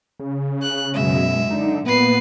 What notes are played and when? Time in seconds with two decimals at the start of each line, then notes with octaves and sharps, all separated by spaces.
0.20 C#3
0.62 F#6
0.95 F#2 B2 G#3 E5
1.50 D3 D#4
1.86 A#2 A#3 B3 B4 C7